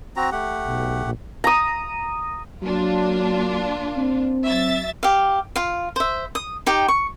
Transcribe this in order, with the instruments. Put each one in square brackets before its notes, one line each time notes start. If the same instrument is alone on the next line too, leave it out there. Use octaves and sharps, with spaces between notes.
[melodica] C4 F#4 A#5
A3 G4 F#5
[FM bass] B1
A#1
[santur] A#5 D#6
[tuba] F#3 [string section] A#3 D4 F4
[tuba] C4
[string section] F#3 E5 A6
[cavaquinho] G4 F5
F4 F5
C5 E5
D#6
D#4 G4 G5
C#6